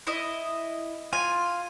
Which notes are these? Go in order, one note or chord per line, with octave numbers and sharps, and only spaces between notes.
E4 D#5
F4 G#5